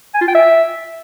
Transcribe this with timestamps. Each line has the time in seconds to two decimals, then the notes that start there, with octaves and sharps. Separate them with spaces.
0.14 G#5
0.21 F4
0.28 G5
0.35 E5